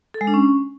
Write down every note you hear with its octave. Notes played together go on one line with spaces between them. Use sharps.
A4
G#3
D4
C#4